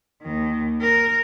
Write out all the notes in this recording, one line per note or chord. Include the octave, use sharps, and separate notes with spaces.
D#2 D#3
A#4